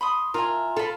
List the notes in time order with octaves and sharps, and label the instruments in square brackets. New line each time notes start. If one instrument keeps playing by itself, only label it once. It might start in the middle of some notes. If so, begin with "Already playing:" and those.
[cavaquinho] B5 C6 D#6
[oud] F4 [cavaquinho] A#4 E5 G#5
[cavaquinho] F4 B5 [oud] A4